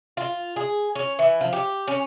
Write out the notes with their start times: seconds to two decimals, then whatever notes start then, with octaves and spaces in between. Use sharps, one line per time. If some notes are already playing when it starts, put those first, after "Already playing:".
0.17 F4
0.56 G#4
0.95 C#4
1.19 E3
1.41 F3
1.53 G4
1.88 C#4